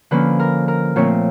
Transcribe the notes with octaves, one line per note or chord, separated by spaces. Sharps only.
D3 F3 A#3 C#4 B4
A#4
A#4
A#2 F3 A3 C4 C#5